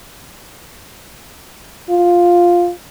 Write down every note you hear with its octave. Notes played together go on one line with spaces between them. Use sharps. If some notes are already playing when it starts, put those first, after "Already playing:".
F4